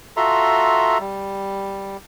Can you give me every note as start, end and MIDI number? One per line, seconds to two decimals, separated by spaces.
0.17 0.98 65
0.17 0.98 66
0.17 0.98 69
0.17 0.98 76
0.17 0.98 82
0.17 0.98 84
1.00 1.97 55